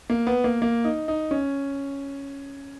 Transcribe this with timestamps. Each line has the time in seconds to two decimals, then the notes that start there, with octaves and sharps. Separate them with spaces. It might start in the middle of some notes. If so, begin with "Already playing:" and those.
0.10 A#3
0.27 B3
0.44 A#3
0.62 A#3
0.84 D#4
1.08 D#4
1.31 C#4